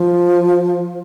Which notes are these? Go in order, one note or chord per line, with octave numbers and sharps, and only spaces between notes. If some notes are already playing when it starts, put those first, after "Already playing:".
Already playing: F3